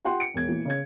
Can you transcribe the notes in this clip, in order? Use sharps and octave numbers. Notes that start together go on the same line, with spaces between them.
F4 G4 F#5 G5 C6
C#7 D7
E1 G#6
A#2 E3
C#3 C#4 G#6